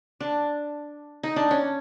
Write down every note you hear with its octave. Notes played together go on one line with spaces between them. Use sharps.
D4
D#4
D4
C#4